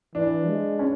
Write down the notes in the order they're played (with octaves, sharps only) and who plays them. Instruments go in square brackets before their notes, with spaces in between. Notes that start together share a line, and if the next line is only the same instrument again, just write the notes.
[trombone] E3 [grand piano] D4
[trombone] G#3
[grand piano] C#4